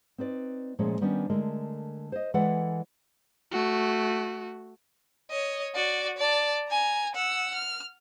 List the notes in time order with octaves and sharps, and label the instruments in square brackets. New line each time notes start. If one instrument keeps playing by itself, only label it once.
[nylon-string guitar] C4 D#4 B4 D5
A#2 F3 G#3 A3 C#4
D#3 G3 B3 C#4 D4
D3 G#3 A3 A#4
C5 D#5
E3 G#3 A4 B4 D5 F#5
[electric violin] A3 F#4
[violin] C#5 D#5
F#4 D5
D5 A5
G#5 A#5
F#5 E6
F6